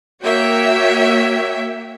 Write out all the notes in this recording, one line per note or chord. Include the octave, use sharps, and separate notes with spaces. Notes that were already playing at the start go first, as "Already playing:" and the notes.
A#3 F#4 C#5 E5 G5